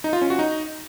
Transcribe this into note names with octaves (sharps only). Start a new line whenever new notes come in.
D#4
F4
C#4
F#4
D#4